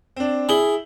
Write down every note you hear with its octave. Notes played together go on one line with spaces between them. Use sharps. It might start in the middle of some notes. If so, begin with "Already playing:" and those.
C4 D4
E4 G#4 F#7 G7